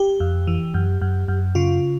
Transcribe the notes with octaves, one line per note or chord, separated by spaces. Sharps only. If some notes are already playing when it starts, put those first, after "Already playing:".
Already playing: G4
F2
E3
F#2
F#2
F#2
C#3 F4